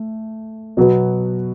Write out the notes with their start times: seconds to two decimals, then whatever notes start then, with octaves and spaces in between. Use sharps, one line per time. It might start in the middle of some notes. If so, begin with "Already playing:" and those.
Already playing: A3
0.77 B2 F#3 B3